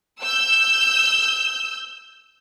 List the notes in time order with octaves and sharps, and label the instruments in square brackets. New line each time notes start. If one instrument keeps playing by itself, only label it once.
[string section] E6 G6